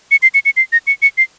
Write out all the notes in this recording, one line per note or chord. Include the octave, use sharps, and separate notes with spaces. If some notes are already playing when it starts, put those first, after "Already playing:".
C#7
C7
C#7
C#7
C7
A#6
C#7
C#7
C7